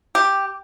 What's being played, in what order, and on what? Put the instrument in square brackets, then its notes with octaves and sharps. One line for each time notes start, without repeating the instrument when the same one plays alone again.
[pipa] G4